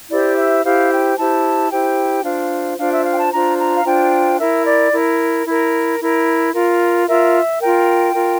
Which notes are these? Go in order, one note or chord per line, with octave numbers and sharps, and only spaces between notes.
E4 G4 C5 D5
E5
E4 G4 C5 F5
G5
E4 G4 C5 A5
E4 G4 C5 G5
D4 F4 C5 F5
D4 F4 C5 F5
E5
F5
G5
A5
D4 F4 C5 A#5
A#5
F5
D4 F4 C5 G5
E4 A#4 E5
D5
E4 A#4
E4 A#4
E4 A#4
F4 A#4
F4 A#4 E5
F4 A#4 G5
F4 A#4